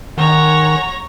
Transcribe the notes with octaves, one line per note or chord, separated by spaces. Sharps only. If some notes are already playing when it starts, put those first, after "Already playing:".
D#3 G#3 C#5 F#5 A#5